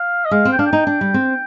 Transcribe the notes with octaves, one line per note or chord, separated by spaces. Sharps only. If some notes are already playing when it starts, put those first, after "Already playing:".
Already playing: F5
D#5
G#3 F5
C4
G5
D4 F5
G5
D#4
D4
G3
C4